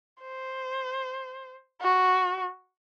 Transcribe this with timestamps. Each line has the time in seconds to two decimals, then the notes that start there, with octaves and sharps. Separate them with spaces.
0.22 C5
1.81 F#4